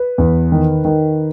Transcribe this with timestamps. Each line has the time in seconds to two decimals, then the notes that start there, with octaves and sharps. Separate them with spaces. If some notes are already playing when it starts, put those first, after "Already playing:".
Already playing: B4
0.18 E2
0.52 D#3
0.85 D#3